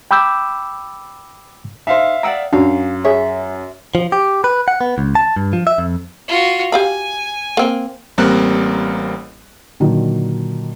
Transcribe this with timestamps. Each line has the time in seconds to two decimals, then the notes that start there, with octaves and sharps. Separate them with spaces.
0.11 G5 B5 D6 E6 G6
1.87 D#4 C5 E5 F5
2.23 D5 F#5 G5 A#5 D#6 E6
2.53 F#2 D4 F#4 F5
3.05 G#4 C#5 E5
3.95 F3
4.12 G4
4.44 B4
4.68 F#5
4.81 B3
4.98 C#2
5.15 A5
5.36 G2
5.53 F3
5.67 E5
5.78 F2
6.28 F4 F#4
6.72 G4 F5 G#5 B5
7.57 A#3 C4
8.18 A1 G3 A#3 C4 A#4 F#6
9.80 A#2 D3 D#3 F#3